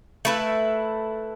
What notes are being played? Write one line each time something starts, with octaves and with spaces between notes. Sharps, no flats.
A3 E4 B4